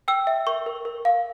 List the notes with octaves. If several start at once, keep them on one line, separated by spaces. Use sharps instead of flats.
G5 E6
E5
A#4 C#6
A#4
A#4
F5